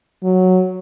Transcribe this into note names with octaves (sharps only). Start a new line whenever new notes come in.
F#3